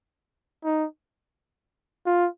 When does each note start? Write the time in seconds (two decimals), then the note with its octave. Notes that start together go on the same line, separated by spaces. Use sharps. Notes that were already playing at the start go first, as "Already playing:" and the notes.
0.65 D#4
2.06 F4